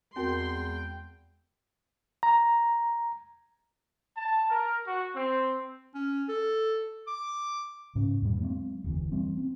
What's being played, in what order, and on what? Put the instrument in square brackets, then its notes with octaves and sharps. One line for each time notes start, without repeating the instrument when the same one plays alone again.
[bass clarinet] E2 [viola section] G#3 C6 [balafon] C4 F#4 A#4 [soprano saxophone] G5
[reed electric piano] A#5
[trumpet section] A5
A#4
F#4
C4
[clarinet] C#4
A4
D6
[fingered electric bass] G#2 C#3 C#4
E2 G#2 B2 G3
F#3 G#3 B3 C4
F1 D2 E3
E3 G3 C4
C4